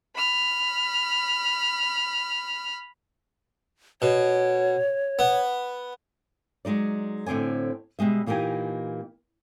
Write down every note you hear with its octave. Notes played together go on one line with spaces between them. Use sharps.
B5 F6
B2 C#5
B3
F#3 G#3 D#4 D5
A2 D3 C4 D5 G#5
B2 G3 G#3 E5
A#2 E3 A#3 D#4 G4 G#5